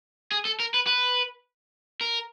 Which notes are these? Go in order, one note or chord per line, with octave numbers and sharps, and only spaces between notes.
G#4
A4
A#4
B4
B4
A#4